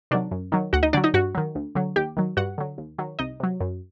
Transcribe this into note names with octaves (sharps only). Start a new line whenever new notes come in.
C3 D#3 F#3 D4 D5
F#2
D#3 F#3
D2 F#4 F#5
D#4 D#5
D3 F#3 D4 D5
D#4 D#5
G2 F#4 F#5
D#3 F#3
D2
D3 F#3
D#2 G4 G5
D#3 F#3
G2 F#4 F#5
D3 F#3
D#2
D#3 F#3
C2 D#4 D#5
C3 F#3
F#2